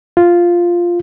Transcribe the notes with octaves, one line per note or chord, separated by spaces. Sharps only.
F4